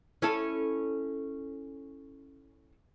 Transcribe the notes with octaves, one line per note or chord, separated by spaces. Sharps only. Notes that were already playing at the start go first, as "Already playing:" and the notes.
C#4 E4 A4